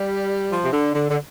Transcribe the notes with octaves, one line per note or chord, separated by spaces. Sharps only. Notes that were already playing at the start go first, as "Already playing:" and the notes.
Already playing: G3
F3
C3
D3
D3
D3